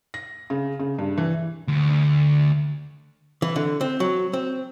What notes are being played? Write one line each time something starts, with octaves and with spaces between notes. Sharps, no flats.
A#6
C#3
C#3
G2
E3
D2
E3
D3
C4
F#3
C4